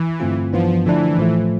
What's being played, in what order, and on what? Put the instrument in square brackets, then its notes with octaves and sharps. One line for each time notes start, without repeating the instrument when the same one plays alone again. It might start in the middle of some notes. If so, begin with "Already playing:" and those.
Already playing: [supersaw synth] E3
[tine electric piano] G2 D3 A3 C4 F4
[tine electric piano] G2 E3 B3 D4 [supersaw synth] F3
[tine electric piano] D3 F3 A3 D4 [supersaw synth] E3
[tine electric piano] A2 F3 A3